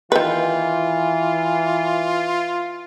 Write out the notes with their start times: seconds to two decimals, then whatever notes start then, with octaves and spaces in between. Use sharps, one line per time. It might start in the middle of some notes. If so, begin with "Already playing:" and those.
0.12 D#3 E3 F4 B4